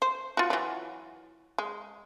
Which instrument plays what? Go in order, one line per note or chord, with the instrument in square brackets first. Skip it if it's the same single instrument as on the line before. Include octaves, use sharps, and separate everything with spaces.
[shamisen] C5
F4 F#4
E3 F#3
G#3